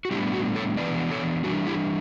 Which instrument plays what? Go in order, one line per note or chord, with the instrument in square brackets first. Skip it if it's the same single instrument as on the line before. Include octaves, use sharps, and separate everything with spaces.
[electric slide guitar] F#4
A2 G3 B3 D4 E4 G4
F#4
A4 C#5
E3 B3 D4 B4 D5
A4 C#5
E3 G3 D4 F#4
E4 G4